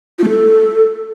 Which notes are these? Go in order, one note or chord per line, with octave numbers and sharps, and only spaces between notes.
F4
A3
A4